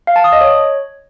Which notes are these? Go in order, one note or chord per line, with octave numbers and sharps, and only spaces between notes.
F5
A5
D#6
D#5
C#5